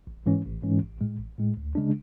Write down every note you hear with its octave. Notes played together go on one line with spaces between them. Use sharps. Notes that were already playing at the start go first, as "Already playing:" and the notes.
A1
G#2 E3 G#3 C#4
A1
G#2 E3 G#3 C#4
A1
A2 G#3
A1
A2 G#3
D2
C#3 G#3 D4